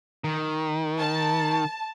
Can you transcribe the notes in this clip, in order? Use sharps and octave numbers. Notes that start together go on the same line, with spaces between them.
D#3
A5